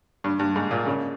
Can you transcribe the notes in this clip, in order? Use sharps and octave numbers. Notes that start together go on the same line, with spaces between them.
G2
G2
G#2
A#2
C#3